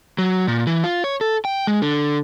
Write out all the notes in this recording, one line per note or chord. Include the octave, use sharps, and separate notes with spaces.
F#3
A#2
E3
F4
C#5
A4
G5
G#3
D3